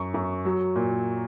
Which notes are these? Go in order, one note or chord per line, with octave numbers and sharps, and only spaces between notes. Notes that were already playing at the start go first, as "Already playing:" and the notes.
Already playing: F#2 C#6
F#2
F#3
A#2